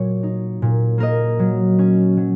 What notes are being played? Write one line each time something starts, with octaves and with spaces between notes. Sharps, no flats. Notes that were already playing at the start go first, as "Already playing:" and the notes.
Already playing: A#2 F#3 C#5
D#4
A#2
A#3 A#4 D#5
F#3
C#4
F#3